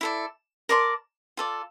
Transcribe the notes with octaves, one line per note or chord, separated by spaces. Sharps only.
E4 A4 D5
A#4 D5 A5 C6
F4 A4 D5